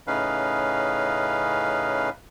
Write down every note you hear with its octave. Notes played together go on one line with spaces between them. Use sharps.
A2 C#3 C#4 D#4 B4 F5